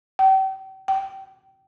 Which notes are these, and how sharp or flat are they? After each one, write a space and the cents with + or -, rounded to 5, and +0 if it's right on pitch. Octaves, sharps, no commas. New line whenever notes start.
G5 -35
G5 -20